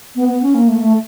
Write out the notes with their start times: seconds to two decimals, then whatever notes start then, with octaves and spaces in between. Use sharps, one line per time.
0.15 B3
0.28 B3
0.42 C#4
0.54 A#3
0.68 A3
0.75 A#3
0.81 A3